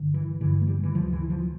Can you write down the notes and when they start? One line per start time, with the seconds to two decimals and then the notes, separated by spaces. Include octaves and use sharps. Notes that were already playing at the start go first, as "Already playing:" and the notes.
Already playing: G1 G2 D3
0.14 E3
0.41 G1 G2 D3 E3
0.61 A3
0.67 G3
0.83 E3
0.94 D2 C#3 F3
1.13 E3
1.30 F3